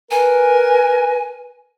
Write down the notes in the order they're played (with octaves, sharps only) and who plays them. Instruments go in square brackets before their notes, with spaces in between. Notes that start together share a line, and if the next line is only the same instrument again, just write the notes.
[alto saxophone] A#4 [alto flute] B4 [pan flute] G#5